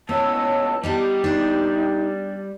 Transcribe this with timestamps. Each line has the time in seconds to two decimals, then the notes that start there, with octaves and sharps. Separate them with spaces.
0.09 B1 C#3 B3 C#5 D#5 A5 E6
0.83 G3 B3 D#4 G4 G#4
1.24 D4 D#4 G#4